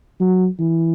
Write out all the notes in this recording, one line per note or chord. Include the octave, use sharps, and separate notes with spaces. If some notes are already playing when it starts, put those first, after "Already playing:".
F#3
E3